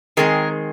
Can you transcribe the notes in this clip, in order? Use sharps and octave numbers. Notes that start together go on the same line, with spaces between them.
D#3 G#3 C4 G#4 A#4